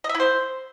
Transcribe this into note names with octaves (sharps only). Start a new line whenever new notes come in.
D#5
E5
E4
C5